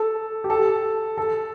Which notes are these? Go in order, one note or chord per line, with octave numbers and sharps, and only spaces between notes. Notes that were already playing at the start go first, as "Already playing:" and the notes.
Already playing: A4
G4
A4
A4